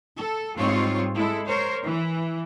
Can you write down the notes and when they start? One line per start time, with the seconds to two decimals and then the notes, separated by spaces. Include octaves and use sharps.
0.16 A4
0.56 G#2 G3 C4 D#4 F4 C#5
1.13 G#3 E4 A4
1.46 A#4 C5 C#5
1.82 E3